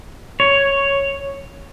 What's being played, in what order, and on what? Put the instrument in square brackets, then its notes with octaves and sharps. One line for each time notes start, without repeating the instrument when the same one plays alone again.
[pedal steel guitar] C#5